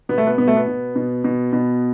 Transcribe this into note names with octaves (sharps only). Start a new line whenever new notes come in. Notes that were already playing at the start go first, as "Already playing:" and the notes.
B2 B3
A3
B3
B2 B3
A3
B3
B2
B2
B2
B2